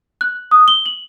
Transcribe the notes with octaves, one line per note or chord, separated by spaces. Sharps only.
F#6
D#6
G7
F#7